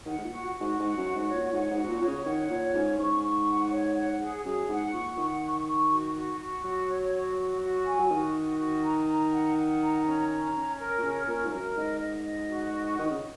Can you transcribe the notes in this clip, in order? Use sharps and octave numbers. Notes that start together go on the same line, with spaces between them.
D#3 F#5
G#2
A#2
F#4
F#4
G#2
G#2 F#5
F#2
F#4
G#2
C#5
A#2
G#2 F#5
G#2
F#4
G#2
A#2
A#2 C#5
C#3
D#3 F#5
A#2 C#5
G#2 C#4
G#2 C#6
C#6
F#5
C#5
F#5
G#4
F#2 G#4
G#2 F#5
A#2 C#6
D#3 F#5
C#6
C#6
F#4
F#4
F#4
F#3 F#4
C#5
F#4
F#4
F#4
G#5
F#3
D#3 F#4
F#4
F#4
A#5
A#5
F#5
F#5
A#5
C#4
A#5
C#4
A#4
A#2
C#3 C#4
A#2 A#4
G#2
F#2 A#4
G#2 D#5
D#5
D#5
F#4
D#5
D#3 D#5
C#3